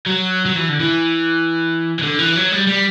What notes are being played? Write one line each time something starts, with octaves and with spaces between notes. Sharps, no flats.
F#3
F#3
E3
D3
E3
E3
D3
E3
F#3
G3
G3